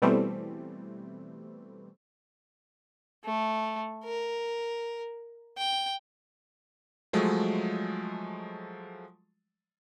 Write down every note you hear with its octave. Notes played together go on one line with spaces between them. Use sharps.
B2 E3 G3 A3 C4
A3
A#4
G5
F3 F#3 G#3 A3